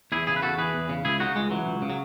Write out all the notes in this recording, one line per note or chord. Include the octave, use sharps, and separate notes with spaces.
E2 E4 G#4
C#3 E4 G#4
B4
E2 F#4 A4
E3 G#4 B4
E2
C#3
C#2 E4 G#4
C#3 D#4 F#4
C#2 G#3
E3 F#3
C#2
C#3
F#3